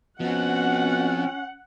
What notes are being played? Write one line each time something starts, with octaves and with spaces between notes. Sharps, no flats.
B2 F3 C4 C#4 F#5